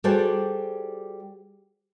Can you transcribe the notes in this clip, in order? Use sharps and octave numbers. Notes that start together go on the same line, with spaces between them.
G3 F#4 G#4 A4 C5 D5